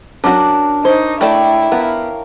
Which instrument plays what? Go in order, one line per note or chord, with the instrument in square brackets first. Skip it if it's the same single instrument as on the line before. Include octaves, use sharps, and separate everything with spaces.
[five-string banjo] F#3 C#4 F#4 [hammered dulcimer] D4 A#4
[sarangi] D#4 [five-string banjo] C5 [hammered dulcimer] C#5
[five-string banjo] A3 D5 A5 [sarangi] E4 [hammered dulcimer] G5
[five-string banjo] B3 [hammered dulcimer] A#4 F5